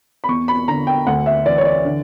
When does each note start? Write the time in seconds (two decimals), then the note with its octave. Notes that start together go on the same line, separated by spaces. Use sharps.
0.24 B5
0.28 E2 C#6
0.48 B5
0.68 D3 A#5
0.87 G5
1.07 D2 F#5
1.26 E5
1.46 E3 D5
1.58 C#5
1.65 D5
1.85 D3